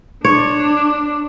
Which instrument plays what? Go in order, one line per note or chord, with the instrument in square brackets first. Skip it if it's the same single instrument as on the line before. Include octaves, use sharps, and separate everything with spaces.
[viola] D4 [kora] C#5